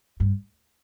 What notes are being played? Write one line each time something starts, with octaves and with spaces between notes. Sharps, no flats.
G2